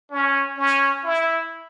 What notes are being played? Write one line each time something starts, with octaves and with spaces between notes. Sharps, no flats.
C#4
C#4
E4